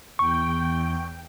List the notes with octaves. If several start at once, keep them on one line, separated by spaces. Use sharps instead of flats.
E2 G5 C#6